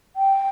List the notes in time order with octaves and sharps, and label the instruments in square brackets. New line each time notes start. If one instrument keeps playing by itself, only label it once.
[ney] G5